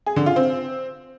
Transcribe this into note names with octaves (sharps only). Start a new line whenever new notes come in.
G#4
D3
F4
C4